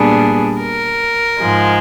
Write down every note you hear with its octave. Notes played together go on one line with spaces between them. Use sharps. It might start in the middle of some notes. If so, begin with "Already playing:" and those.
Already playing: A#2 G3 B3 D4 G#4
A#4
G#2 F3 G#3